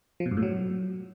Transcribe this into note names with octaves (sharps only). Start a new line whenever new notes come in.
F3
B2
G2
A2
F#3